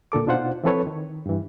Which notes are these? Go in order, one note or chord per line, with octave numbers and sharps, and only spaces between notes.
A#2 D3 A4 D6
B2 D4 D#4 F4 C5 F#5
E3 F3 C4 A4 B4 C#5
D#3
G2 E3